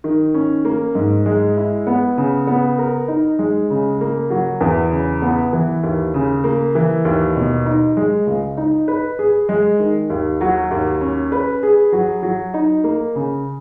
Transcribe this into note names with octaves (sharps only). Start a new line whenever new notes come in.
D#3
C#4
A#3
G#2
G#3
E4
B3
C#3
B3
A#4
D#4
G#3
C#3
A#3
F#3
E2
C#3
B3
E3
D#2
C#3
A#3
E3
D#2
B2
D#4
G#3
C#2
D#4
B4
G#4
G#3
D#3
D#2
F#3
D#2
C#4
B4
G#4
F#3
F#3
D#4
A#3
C#3